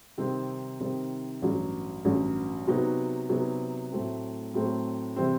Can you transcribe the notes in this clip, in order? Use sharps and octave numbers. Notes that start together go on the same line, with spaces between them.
C3 D#3 G3 C4 D#4
C3 D#3 G3 C4 D#4
A1 G2 F#3
A1 G2 F#3
C3 F#3 B3 D#4 F#4
C3 F#3 B3 D#4 F#4
A2 F#3 A3 C4
A2 F#3 A3 C4
C3 E3 G3 C4